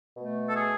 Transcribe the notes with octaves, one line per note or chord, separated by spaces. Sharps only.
B2 A3
A4
G#4